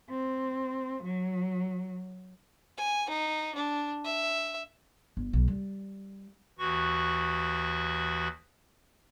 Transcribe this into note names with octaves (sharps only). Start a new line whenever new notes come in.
C4
F#3
G#5
D#4
D4
E5
G1
B1
G3
D#2 E3 F#4 C#6